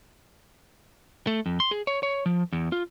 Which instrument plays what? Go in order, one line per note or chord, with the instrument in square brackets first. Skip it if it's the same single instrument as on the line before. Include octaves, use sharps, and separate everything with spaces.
[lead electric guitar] A3
F2
C6
G#4
C#5
C#5
F3
E2
F4